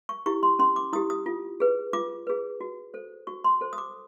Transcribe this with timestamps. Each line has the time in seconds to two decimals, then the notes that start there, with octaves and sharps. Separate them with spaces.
0.09 C#6
0.26 E4 G4 C#6
0.43 C6
0.59 C#4 C6
0.76 D6
0.93 E4 G4 D#6
1.10 D#6
1.26 F4
1.60 G#4 B4
1.93 F4 D6
2.27 G#4 B4
2.61 F#4
2.94 A4 C5
3.27 F#4 C#6
3.44 C6
3.61 A4 C5
3.73 D#6
3.78 D6